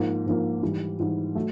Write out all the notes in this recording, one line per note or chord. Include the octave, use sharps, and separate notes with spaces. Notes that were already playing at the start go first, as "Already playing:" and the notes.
Already playing: G#2 F3 A#3
G#2 F3 A#3
G#2 E3 G3
G#2 E3 G3
F#3 A3